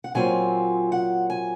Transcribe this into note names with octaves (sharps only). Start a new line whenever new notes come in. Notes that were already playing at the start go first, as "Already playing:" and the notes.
F#5
A#2 F#3 C4 F4 G#5
F#5
G#5